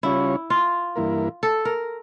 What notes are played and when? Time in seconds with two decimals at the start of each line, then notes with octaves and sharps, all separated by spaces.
0.03 C#3 G3 C#4 E4 F4 C#5
0.50 F4
0.96 G2 E3 A#3 E4 A#4
1.43 A4
1.65 A#4